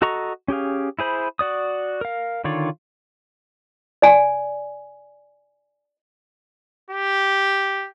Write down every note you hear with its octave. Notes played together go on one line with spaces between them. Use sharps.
F#4 A4 D#5 A#5 C#6
C#4 G4 G#4 F5
E4 G#4 C5 B5
F#4 D5 D#6
A#4 F5
D3 D#3 F4 C#5 D5
D5 G#5
G4